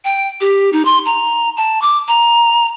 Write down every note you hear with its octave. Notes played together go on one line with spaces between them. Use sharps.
G5
G4
D#4
C6
A#5
A5
D6
A#5